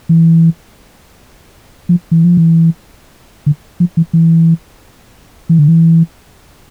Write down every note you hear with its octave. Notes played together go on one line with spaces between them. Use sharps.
E3
F3
E3
F3
E3
D3
F3
E3
E3
E3
D3
E3